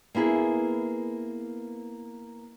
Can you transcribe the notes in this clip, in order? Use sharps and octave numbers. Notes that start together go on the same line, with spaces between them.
A#3 B3 E4 G#4